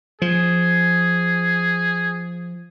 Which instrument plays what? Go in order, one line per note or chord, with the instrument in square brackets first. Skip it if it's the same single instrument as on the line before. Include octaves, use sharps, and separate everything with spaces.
[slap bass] F3 [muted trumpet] G#4